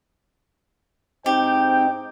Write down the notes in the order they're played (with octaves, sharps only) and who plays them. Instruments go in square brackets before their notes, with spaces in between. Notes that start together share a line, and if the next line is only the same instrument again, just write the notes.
[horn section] G#2 G5 [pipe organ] C4 D#4 [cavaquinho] G4